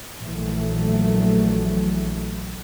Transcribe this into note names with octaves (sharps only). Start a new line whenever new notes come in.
A#1 E3 F#3 A3